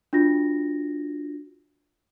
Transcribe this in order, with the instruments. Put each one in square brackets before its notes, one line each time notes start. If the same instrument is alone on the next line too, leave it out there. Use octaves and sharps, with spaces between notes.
[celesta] D4 F4 F#4 A#6